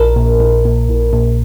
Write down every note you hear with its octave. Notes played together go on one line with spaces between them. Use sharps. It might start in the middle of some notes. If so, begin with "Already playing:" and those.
Already playing: A#1 A#4
A#2
A#1
A#2
A#1
A#2